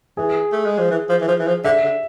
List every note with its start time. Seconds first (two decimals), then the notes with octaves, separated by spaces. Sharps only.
0.17 E3 G#4
0.52 A3
0.66 G#3
0.78 F3
0.91 E3
1.09 F3
1.21 E3
1.28 F3
1.39 E3
1.47 F3
1.64 D3 E5
1.84 D3